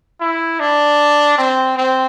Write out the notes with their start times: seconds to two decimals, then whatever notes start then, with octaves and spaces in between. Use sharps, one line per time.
0.21 E4
0.60 D4
1.38 C4
1.77 C4